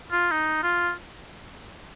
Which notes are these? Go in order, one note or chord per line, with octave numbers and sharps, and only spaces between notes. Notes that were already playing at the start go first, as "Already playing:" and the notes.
F4
D#4
F4